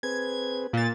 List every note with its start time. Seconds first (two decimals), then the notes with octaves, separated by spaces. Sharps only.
0.03 C4 G#4 B4 G#6
0.73 A#2 A6